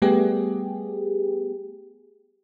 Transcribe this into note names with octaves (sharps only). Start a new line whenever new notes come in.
G3 A3 B3 G4 G#4